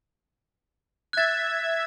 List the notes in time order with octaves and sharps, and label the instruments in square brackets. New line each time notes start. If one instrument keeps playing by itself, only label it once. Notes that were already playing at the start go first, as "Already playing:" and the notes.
[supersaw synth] E5 G#6 [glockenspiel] F#6 A6